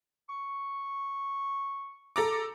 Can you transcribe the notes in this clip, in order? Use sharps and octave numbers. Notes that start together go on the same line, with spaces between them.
C#6
A4 A#5 D6